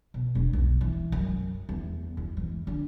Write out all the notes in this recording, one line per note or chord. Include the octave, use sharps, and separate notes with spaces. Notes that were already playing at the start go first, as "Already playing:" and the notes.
B2
E1
B1
E3
F#2
E2
E2
E3
D3